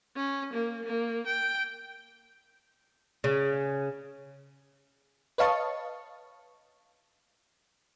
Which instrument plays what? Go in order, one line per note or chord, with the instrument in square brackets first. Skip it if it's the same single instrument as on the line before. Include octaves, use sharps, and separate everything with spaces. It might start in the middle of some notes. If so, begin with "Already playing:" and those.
[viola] C#4
A#3
A#3
G5
[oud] C#3
[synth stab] B4 C#5 D#5 F5 A5 C#6